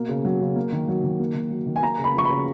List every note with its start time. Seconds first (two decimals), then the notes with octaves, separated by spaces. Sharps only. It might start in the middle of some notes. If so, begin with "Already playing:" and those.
Already playing: B2 A#3
0.09 C#3
0.25 F#3
0.41 C#3
0.56 A#3
0.72 D#3
0.88 F#3
1.04 D#3
1.19 A#3
1.35 D#3
1.50 F#3
1.67 D#3
1.76 G#5
1.82 A#3 A#5
1.99 C#3
2.04 B5
2.15 F3 C#6
2.25 C#3 B5